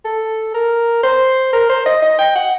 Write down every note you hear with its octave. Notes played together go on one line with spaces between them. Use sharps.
A4
A#4
C5
A#4
C5
D#5
D#5
G5
F#5